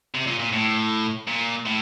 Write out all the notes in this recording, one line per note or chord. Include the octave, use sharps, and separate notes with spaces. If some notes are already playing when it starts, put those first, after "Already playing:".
C3
A#2
A#2
A2
A#2
A2